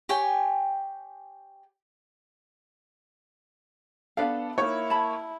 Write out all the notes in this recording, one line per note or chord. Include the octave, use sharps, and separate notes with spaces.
G4 C#5 G5 G#5
B3 D4 A4 B4 D5 F5
A#3 D#4 E4 C#5
A5 B5